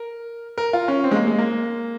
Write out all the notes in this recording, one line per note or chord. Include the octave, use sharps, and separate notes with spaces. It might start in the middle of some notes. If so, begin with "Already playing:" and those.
Already playing: A#4
A#4
F4
C#4
C4
G#3
A#3
G#3
A#3